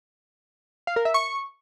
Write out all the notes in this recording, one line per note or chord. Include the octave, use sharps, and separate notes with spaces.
F5
A#4
E5
C#6